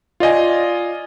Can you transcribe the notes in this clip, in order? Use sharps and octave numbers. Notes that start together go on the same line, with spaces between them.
F4 D5 D#5 G#5